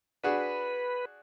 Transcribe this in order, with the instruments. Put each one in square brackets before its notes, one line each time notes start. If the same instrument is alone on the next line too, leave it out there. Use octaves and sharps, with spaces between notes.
[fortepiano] D4 F#4 G#4 [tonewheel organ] B4